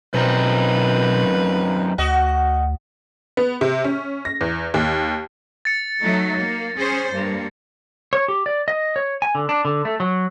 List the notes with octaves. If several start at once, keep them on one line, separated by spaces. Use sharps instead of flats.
F#2 B2 F3 C4 D#4 B4
D2 F#4 D#5
B3
C3
C#4
A#6
E2
D#2
A6 C#7
F#3 A3 D#4
A#3
C#4 G#4 C5
G2 A#3
C#5
G4
D5
D#5
C#5
G#5
D3
D4
D3
A3
F#3